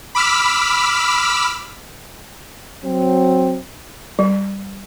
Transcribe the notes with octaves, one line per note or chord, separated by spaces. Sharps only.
B5 D6 E6 F6 B6
F#3 C4
G3